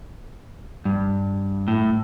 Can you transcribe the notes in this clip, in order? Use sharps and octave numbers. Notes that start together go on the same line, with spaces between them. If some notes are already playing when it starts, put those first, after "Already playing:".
G2
A2